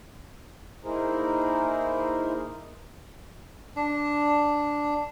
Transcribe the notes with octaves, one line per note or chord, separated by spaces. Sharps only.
A#3 D#4 E4 G#4 A#4 C5
D4